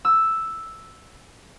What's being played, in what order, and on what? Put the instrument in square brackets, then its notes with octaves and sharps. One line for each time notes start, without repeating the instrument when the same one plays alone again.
[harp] E6